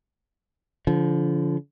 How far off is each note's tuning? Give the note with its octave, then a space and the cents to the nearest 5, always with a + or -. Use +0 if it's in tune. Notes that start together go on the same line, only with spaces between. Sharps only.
D3 -40 F3 -20